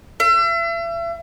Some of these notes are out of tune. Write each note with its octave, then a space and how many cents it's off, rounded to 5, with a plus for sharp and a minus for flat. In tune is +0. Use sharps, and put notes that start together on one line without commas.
E5 +40